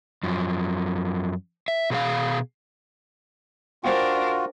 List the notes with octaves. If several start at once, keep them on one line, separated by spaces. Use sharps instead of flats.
F#2 F3
E5
B2 G#4 C5 F5
D4 F4 F#4 A#4 C5 G5